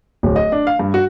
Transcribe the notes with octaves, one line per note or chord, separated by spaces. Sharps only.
D1
D#5
D4
F5
G2
F#4